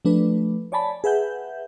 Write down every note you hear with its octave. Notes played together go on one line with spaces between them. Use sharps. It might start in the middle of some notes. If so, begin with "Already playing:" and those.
F3 A3 D4 B4
C#5 D5 G#5 A5 B5
G#4 B4 E5 F#5 G6